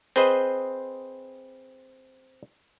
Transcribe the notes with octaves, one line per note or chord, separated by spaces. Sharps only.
C4 G#4 B4 C5 D#5